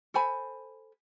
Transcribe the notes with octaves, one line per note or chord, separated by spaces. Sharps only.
A4 C5 G#5 B5